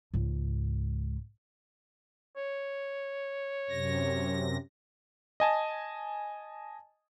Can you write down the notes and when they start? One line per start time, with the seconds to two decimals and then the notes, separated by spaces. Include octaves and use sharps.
0.14 C#2 G#2
2.37 C#5
3.70 F#2 C3 A#6
5.40 D#5 G#5 A5